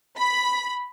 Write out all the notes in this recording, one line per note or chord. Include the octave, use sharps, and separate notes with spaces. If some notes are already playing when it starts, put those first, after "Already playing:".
B5